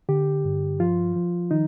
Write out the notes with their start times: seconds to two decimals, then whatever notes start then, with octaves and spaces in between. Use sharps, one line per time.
0.09 D3 G4
0.45 G2
0.80 F3 F4
1.15 F3
1.51 D#3 D#4